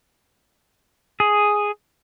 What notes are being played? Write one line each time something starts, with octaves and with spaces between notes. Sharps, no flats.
G#4